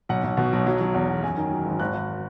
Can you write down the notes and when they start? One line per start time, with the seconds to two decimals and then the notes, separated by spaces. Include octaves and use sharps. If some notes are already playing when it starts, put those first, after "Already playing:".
0.09 B1 F#5
0.24 B1
0.37 B2
0.53 B1
0.67 F#3
0.81 F#3
0.94 E2
1.09 E2
1.23 F#2 G#5
1.37 D#3
1.51 F#3
1.66 G#1
1.80 G#1 F#6
1.94 G#1